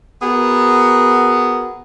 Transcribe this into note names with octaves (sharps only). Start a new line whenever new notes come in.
B3 F#4 G#4 A#4